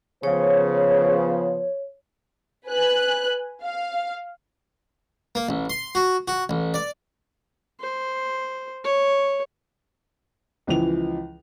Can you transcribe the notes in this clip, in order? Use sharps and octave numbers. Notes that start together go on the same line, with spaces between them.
C#3 F3 B3 C5 C#5
B4 G#5 F#6
F5
A#3
A1
C6
F#4
F#4
A1
D5
C5
C#5
C#2 E3 F3 F7